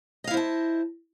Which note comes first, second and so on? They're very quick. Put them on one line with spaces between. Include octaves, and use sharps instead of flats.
D#5 F5 E4 C5 A5